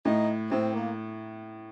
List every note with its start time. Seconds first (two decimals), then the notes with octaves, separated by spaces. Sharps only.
0.05 A2 D#4
0.51 A2 C4
0.74 A#3